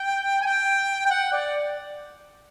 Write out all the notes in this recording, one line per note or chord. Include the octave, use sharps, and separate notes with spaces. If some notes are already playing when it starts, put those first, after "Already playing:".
Already playing: G5
G#5
G5
G5
F#5
D5